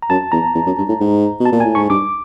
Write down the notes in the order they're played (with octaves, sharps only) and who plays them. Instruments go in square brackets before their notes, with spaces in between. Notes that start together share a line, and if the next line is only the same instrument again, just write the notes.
[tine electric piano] A#5
[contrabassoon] F#2 [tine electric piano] A5
[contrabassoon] E2 [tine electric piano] A#5
[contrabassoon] E2
F#2
G2
A2
G#2
B2
[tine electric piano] A5
[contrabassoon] A#2
[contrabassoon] A2 [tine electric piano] G#5
[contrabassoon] G#2 [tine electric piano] C#6
[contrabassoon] G2 [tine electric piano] D6